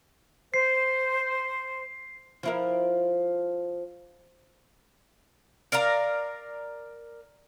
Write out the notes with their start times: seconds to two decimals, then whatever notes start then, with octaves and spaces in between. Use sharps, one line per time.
0.54 C5 C7
2.43 F3 E4 A#4
5.72 A#4 D5 F5 A#5